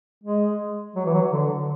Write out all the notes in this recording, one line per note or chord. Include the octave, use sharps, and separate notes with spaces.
G#3
F#3
E3
F#3
D3